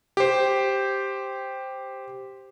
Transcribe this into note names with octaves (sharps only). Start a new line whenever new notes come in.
G4 C5